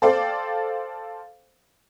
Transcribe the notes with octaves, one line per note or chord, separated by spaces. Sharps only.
A4 C5 D5 F5 G5